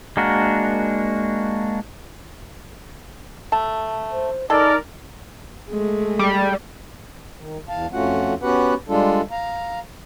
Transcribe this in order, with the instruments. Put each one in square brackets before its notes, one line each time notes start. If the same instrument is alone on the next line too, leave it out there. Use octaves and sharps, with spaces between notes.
[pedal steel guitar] G#3 A#3 D4 F#4 A#4
[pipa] A3 A5
[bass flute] C5
[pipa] G#3 A4 [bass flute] D#4 [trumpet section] A#4 D5
[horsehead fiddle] G#3 A3
[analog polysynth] G3
[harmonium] D#3
E2 F5 A5
F2 A3 C#4 F4 F#4 F#5
B3 C#4 F#4 G4 B4 F#5
G3 G#3 D4 F4 A4
F5 A#5